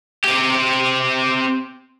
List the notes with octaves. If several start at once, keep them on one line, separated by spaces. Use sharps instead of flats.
C4 G4